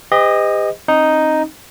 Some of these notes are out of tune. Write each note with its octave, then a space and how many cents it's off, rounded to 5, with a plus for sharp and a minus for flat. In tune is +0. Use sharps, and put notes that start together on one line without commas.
G4 +40 C5 -45 D#5 +0
C4 +45 D#4 +0